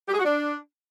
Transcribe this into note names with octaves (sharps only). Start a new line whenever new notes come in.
G4
G#4
F#4
D4